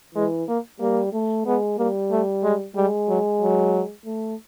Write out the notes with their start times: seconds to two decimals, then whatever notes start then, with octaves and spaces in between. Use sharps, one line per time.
0.15 E3 G#3
0.48 A#3
0.80 G3 A#3
1.13 A3
1.46 G#3 B3
1.78 G3 A#3
2.11 A3
2.44 G#3
2.76 G3 G#3
3.08 F#3
3.42 F#3
4.06 A3